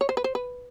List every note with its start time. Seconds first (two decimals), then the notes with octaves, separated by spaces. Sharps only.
0.01 C#5
0.09 C5
0.17 B4
0.24 C5
0.35 B4